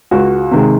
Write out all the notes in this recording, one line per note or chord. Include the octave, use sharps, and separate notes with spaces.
C#2 F#4
C3 D#3 G#3